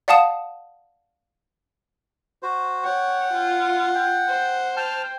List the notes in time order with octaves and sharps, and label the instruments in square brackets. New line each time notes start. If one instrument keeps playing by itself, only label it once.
[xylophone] D5 F5 F#5 A5 D#6 E7
[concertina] F#4 C5
[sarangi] C#5 [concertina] F#5 [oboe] G5
[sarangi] F4
[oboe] G5
[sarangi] C5
[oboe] G5 [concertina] A5 F6